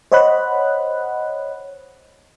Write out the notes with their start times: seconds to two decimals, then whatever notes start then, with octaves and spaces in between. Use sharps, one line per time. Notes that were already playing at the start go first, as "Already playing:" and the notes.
0.12 C5 C#5 D#5 F#5 B5 F#6